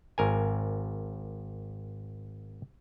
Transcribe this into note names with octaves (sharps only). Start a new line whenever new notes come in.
G#1 A#4 G#5